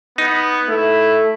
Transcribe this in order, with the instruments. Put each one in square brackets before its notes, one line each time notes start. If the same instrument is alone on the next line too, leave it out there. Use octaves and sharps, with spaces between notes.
[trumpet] B3 [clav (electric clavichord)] D#4
[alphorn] A3 [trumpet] E4